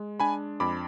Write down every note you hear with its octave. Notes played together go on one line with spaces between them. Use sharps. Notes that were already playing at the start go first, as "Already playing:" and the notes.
Already playing: G#3
D4 G#5 B5
F2 B5 D6